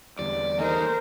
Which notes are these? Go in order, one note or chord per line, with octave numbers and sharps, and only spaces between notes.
E2 D3 E3 G3 D5
D#2 D#4 A4 A#4 C5 D#5 G#5